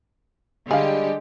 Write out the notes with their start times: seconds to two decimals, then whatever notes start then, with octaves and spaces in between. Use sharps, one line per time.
0.71 D3 G3 G#3 G4 G#4 F5